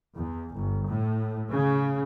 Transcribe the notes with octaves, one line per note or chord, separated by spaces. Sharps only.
E2
G1
A2
C#3